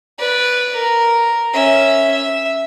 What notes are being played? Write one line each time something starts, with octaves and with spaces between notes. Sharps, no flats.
B4 D5
A#4
C#4 E5
E5